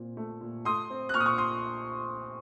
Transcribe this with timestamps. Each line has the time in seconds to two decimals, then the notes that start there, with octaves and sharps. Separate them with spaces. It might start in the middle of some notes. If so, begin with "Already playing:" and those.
Already playing: A#2 C4
0.17 A3
0.41 A#2
0.65 A3 C6 D#6
0.90 C4
1.09 F#6
1.14 A#2 C#6 F6
1.20 D#6
1.26 C#6 F6
1.38 C6 D#6